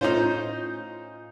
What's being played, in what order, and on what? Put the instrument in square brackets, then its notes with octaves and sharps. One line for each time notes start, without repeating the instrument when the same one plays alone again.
[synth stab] A2 C#4 F4 [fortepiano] D#4 C5